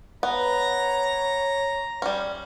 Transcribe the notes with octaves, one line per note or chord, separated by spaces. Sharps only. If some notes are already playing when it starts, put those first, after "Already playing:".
B3 C#5 A#5
G3 C#4